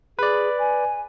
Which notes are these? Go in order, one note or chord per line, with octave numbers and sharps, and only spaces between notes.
G#4 B4 D5
G#5